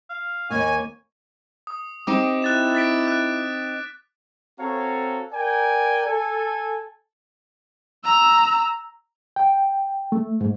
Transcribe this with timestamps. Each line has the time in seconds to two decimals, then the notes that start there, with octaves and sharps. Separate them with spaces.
0.10 F5
0.50 D#2 A#3 C#5 D#5 G#5
1.67 D#6
2.07 C4 D#4 G4 D6
2.42 E4 F#6 A6 E7
2.75 A6 B6 D7
3.08 F#6
4.60 C4 F#4 A4 C#5 F5 A#5
5.33 A#4 D5 G5 G#5
6.07 A4 G#5
8.04 A#5 E6
9.36 G5
10.12 A3
10.41 G#2